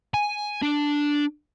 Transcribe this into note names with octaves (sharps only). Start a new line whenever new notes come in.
G#5
D4